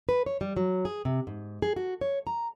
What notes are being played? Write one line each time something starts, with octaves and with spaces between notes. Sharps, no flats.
B4
C#5
G3
F#3
G#4
C3
G#2
G#4
F#4
C#5
A#5